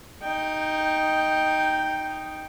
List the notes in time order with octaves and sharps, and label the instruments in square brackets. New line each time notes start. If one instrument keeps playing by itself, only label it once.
[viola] D#4 G5